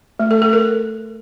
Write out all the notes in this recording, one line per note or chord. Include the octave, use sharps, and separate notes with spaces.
A3
A4
A4
A#4